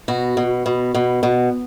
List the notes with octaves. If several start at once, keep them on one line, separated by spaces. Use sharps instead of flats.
B2 F#4
B2
B2
B2
B2